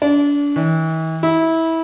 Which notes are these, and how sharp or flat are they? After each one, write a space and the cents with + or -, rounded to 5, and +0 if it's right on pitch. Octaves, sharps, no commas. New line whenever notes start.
D4 -30
E3 -45
E4 -20